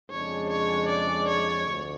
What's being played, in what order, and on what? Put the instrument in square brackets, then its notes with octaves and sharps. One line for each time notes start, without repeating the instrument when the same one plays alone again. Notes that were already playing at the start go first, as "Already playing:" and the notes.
[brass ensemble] F2 C#3 G#3 D4 [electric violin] C#5
[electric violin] C#5
D5
C#5
[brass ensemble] D2